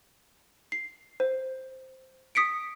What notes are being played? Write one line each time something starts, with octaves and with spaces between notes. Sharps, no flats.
C7
C5
D#6 B6 C#7 D7